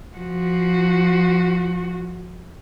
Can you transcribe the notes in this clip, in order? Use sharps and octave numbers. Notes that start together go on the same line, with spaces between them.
F3 F#4